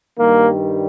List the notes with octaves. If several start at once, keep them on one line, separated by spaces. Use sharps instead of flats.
G2 D#3 G3 A#3